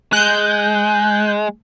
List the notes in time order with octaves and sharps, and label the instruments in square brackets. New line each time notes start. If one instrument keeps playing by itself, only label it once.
[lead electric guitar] G#3 [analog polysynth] F#6 G6